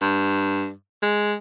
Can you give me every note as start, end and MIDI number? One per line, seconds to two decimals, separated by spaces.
0.02 0.71 43
1.02 1.35 56